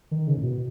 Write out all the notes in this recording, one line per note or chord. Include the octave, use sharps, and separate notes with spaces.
D#3
C#3
A2
B2